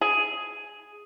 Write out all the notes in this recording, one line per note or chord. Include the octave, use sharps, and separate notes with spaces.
G#4